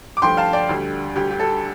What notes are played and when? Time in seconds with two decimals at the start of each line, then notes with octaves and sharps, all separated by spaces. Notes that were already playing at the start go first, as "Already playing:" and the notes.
0.17 D6
0.22 G2 F3 A3 G5 C6
0.37 F5 A5
0.53 D5 G5
0.69 D2 D3 G3
1.16 D2 D3 G3 G4
1.31 G4
1.40 A4